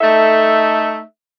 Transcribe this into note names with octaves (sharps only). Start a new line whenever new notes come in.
A3 D#4 A4 E5